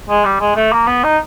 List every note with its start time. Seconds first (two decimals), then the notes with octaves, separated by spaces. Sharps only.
0.09 G#3
0.25 G3
0.40 G#3
0.56 A3
0.72 A#3
0.87 B3
1.03 D#4